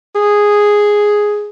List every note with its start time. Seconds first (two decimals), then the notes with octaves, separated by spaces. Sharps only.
0.15 G#4